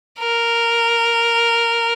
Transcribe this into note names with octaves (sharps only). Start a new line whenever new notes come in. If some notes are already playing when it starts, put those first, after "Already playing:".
A#4